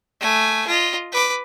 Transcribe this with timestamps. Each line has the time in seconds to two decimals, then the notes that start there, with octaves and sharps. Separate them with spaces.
0.21 A3 G#5
0.67 F4 D#5
1.12 B4 D6